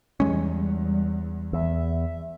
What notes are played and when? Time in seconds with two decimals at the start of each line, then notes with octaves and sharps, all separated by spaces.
0.20 E2 G3 G#3 C#4
1.53 E2 E5